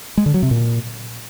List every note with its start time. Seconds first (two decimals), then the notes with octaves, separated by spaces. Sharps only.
0.17 G#3
0.26 D3
0.34 F#3
0.42 C3
0.51 A#2